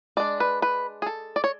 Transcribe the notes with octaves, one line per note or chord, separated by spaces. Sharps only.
G#3 D4 D5
B4
B4
G#4
A4
D5
C#5